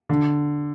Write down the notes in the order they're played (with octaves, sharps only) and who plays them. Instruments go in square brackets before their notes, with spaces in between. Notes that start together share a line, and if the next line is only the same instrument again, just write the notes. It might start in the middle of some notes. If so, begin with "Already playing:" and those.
[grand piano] D3